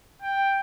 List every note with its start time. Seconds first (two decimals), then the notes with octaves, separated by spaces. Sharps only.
0.22 G5